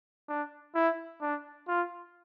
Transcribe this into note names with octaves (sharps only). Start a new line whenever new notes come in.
D4
E4
D4
F4